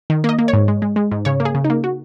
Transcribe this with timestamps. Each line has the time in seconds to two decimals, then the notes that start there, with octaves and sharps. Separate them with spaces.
0.10 D#3
0.24 A#3 D#5
0.39 A#3
0.48 C#5
0.53 G#2
0.68 G#3
0.82 G#3
0.96 G#3
1.12 G#2
1.25 C#3 C#5
1.40 A#3
1.45 G#4
1.55 C#3
1.64 D#4
1.70 A#3
1.84 F#4